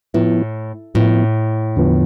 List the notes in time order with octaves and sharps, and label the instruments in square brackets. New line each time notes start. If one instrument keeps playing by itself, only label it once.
[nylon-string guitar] A2 [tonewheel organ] F3 B3 E4
[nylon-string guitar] A2 [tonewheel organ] F3 B3 E4
[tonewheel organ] E2 D3 F3 B3